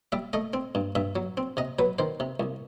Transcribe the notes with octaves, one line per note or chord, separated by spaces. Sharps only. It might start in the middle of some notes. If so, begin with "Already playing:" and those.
G3 E5
A3 D#5
C4
G2
G2 E5
F#3
C4
C3 D#5
F#3 B4
D#3 C5
C3
C2